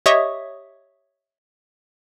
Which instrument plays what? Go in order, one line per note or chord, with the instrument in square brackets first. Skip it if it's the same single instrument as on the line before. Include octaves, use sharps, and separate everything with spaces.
[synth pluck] G4 C#5 D#5 E5 C#6 D#6